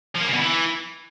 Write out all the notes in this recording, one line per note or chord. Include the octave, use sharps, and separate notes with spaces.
F3
A#3
C#3
B2
E3